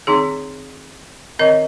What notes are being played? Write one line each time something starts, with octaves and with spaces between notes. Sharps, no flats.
D#3 C4 D#4 G#4
D#3 C4 A#4 D#5